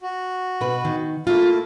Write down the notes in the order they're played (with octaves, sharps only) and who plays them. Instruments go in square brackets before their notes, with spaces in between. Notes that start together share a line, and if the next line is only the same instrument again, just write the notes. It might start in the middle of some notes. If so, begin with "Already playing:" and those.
[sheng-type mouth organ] F#4
[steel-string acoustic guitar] B2 B4
D#3
[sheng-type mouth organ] A3 A#3 E4 [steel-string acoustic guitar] F4